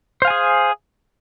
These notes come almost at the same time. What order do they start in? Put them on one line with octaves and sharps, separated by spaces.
C5 F5 G#5 G#4